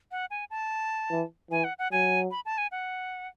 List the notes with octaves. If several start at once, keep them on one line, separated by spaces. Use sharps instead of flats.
F#5
G#5
A5
E3
E3 G#5
F#5
F#5
F#3 G#5
B5
A5
G#5
F#5